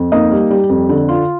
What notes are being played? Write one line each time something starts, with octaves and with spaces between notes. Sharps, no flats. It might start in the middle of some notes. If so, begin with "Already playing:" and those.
Already playing: F2
A#3 D#4 D#5
G3
G3
F2
D3
F4